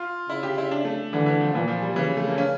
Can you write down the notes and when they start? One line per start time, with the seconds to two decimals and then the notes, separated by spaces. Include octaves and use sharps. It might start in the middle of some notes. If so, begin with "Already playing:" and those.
Already playing: F4
0.29 C#3 E4
0.43 G4
0.58 E4
0.71 D4
0.85 A3
1.13 D3 E3
1.26 E3
1.41 F3
1.54 A#2 E3
1.68 F3
1.82 G3
1.96 C#3 E3
2.17 A3
2.28 A#3
2.38 C#4